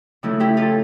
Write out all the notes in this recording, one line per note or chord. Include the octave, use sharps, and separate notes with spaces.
C#3 F3 A3 E4
E4 G4
F4 A4